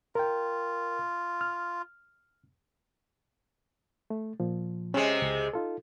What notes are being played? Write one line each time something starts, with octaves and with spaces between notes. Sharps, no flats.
F4 A#4 G5
F6
A3
A#2 F3
C3 G#3 C#4 G#4
C#2
D#4 F4 A4